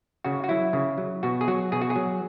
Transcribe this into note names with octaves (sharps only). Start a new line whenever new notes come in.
C#3 F#4
F#4
F#3 E4
C#3
F#3
B2 F#4
G#4
F#3 F#4
B2 G#4
F#4
G#4
F#3